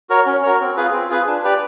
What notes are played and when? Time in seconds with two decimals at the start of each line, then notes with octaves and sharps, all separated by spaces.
0.10 F#4 A#4 C#5
0.26 C#4
0.43 F#4 A#4 C#5
0.60 C4
0.76 F4 G#4 B4
0.93 C4
1.09 F4 G#4 B4
1.27 D4
1.44 G4 B4 D5